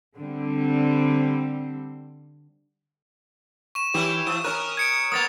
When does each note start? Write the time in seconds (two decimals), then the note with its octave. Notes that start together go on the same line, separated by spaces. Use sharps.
0.17 D3 G3 C4
3.75 C#6 E7
3.94 E3 C#4 E4 G4
4.27 E3 D#6
4.44 C#4 A#4 F#6
4.77 G#6 C#7 D7
5.12 A#3 B3 D#6 A6 F7